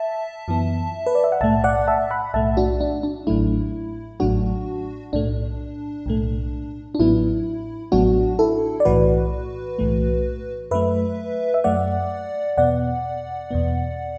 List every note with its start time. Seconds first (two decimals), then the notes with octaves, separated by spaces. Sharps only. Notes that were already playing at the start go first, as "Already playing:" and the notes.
Already playing: E5 A5
0.48 F#2 E3 B3
1.06 B4
1.15 D5
1.24 E5
1.32 F#5
1.41 B1 A2 A3 E5 A5
1.64 D5 F#5
1.87 E5 A5
2.11 F#5 B5
2.34 B1 A2 A3 E5 A5
2.57 D4 F#4
2.81 D4
3.03 D4
3.27 A1 A2 F#3 A3 E4
4.20 A1 A2 F#3 A3 D4 F#4
5.13 B1 A2 A3 D4
6.06 B1 A2 A3
6.95 D4
6.99 A1 A2 F#3 B3 E4
7.92 A1 A2 F#3 B3 D4 F#4
8.39 E4 A4
8.80 D5
8.85 B1 A2 E3 A3 F#4 B4
9.79 B1 A2 E3 A3
10.71 F#2 F#3 A3 B4 E5
11.54 E5
11.64 F#2 F#3 A3 D5 F#5
12.57 E2 B2 B3 D5 F#5
13.51 E2 B2 B3